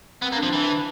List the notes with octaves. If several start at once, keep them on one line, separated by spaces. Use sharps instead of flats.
B3 C4
A#3
D4
F3
E3